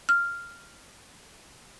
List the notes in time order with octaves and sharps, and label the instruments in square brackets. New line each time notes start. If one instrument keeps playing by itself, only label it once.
[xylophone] F6